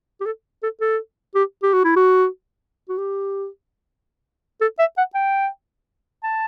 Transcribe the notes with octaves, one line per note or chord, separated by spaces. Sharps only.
G4
A4
A4
A4
G4
G4
F#4
E4
F#4
F#4
G4
A4
E5
F#5
G5
A5